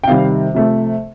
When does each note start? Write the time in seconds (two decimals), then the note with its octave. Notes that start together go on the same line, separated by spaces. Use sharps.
0.04 G5
0.07 C3 D#3 G3 F5
0.54 C3 F3 A3